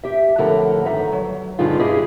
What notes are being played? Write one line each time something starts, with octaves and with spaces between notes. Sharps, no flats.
G4 E5
F2 A2 D3 A4 A#4 F#5
G2 D#3 E5 F#5 A#5
F#3
G2 D3 G#3 C#4 D#4 F4
G2 C#4 E4 G4 G#4 D#5